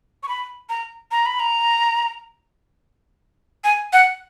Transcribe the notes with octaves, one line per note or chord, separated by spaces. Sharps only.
C#6
B5
A#5
A#5
B5
A#5
G#5
F#5